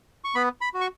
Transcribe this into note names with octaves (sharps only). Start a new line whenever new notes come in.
C#6
B3 B5
B5
F#4
C#6